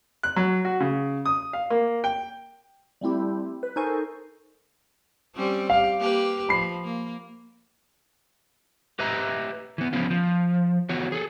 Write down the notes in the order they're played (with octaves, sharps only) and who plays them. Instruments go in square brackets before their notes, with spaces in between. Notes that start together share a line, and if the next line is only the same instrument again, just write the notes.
[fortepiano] F#6
F#3
F#4
C#3
D#6
F5
A#3
G5
[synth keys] G3 A3 C4 E4 G4
B4
D#4 A4 A#4 C5 G#5 C#6
[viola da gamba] G3 C4 C#4
[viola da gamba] G4 [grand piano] F5
[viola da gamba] A#3 G4 B4
[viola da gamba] F3 [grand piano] B5 C7
[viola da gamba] A#3
[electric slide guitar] G4 B4 D#5 E5 A#5
E3 B3
F3 B3 C#4 F4
F3
E3 B3 F#4 C#5
G#4 A4